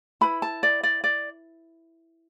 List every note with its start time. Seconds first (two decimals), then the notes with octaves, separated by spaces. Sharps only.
0.21 E4 B4 B5
0.42 A5
0.63 D5
0.83 D5
1.04 D5